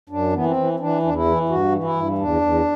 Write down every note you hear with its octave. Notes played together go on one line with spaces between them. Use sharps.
F#2 D4
E3 B3
C4
E3
E3 D4
E2 D4
E4
E3
G2 F#4
E3
E4
G2
E2 D4
E2